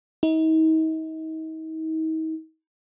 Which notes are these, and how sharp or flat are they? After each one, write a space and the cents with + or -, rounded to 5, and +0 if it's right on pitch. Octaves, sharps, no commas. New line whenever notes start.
D#4 +40